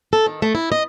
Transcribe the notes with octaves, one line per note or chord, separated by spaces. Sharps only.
A4
D#3
A3
E4
D#5